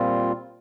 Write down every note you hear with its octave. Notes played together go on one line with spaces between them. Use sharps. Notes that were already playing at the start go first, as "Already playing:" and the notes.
Already playing: A#2 G3 C4 F4